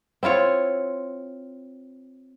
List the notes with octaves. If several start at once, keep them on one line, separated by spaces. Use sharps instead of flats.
C4 E4 F4 C#5